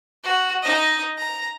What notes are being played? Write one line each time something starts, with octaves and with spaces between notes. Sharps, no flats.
F#4
D#4 D#5
A#5